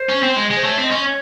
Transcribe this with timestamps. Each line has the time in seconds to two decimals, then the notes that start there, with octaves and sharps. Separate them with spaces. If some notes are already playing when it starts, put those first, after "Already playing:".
Already playing: C5
0.10 C#4
0.23 C4
0.37 G#3
0.51 G#3
0.56 C5
0.64 A3 C#5
0.78 C4 D#5
0.91 C#4
1.01 C#5